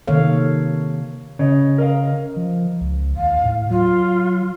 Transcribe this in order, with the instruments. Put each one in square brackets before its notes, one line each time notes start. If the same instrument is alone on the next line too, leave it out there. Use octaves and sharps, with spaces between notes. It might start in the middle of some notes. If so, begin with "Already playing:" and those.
[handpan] C3 D#3 A#3 A4 C#5 F5
[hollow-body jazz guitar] C#3 [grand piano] C#5 D#5
[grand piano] A#4 D#5 F5
[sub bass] F3
C#2
[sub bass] D#2 [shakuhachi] F5
[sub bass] A2
[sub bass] F#3 [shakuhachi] F4